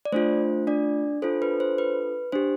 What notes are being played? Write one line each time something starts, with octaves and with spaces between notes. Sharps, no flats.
D5
A3 D4 F4 C5
D4 D5
D4 F4 A4 C5
B4
C5
B4
D4 G4 C5